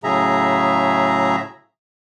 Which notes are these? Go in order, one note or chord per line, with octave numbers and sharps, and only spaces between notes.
A2 C#3 F#3 G#4 E5 A#5